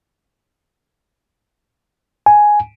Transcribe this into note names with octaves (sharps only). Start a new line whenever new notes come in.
G#5